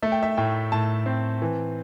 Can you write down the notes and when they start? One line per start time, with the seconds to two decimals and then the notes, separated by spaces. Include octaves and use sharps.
0.02 A3 E5
0.12 G5
0.23 E5
0.37 A2 G5
0.72 A2 A5
1.06 C4
1.42 E3